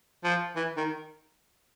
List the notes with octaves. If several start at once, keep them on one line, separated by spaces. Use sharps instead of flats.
F3
E3
D#3